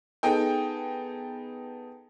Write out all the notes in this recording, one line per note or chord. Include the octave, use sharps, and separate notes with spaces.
B3 D#4 G#4 A4 G5